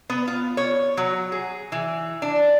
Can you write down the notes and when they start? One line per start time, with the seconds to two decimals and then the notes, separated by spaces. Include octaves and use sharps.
0.10 B3
0.27 F4
0.57 C#5
0.97 F#3
1.32 G#4
1.72 E3
2.22 D4